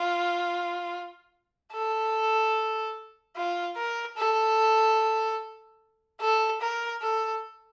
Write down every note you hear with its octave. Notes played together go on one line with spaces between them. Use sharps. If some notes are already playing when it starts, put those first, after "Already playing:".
Already playing: F4
A4
F4
A#4
A4
A4
A#4
A4